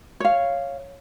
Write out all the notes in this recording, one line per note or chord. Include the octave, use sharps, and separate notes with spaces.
C#5 F5